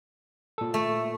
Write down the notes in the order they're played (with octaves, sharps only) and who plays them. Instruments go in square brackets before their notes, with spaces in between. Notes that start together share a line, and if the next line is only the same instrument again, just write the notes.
[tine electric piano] A#2 A4
[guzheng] A3